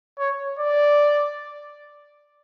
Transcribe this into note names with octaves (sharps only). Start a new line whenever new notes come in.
C#5
D5